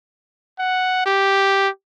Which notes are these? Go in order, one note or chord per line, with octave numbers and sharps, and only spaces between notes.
F#5
G4